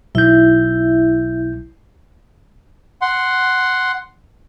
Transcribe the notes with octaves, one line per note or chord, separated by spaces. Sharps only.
B1 E4 E5 G6
F#5 C6